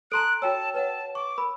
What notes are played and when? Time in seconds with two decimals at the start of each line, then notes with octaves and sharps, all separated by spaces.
0.12 A4 A5 A#5 C6 F#6 D7
0.42 F#4 C#5 G5 A5 E6
0.74 B4 C#5 F#5 A5
1.15 C#6 D6
1.38 A#4 B5